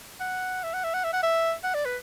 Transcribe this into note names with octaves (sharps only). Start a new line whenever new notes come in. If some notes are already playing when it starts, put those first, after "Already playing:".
F#5
E5
F#5
E5
F#5
E5
F#5
E5
F#5
D5
B4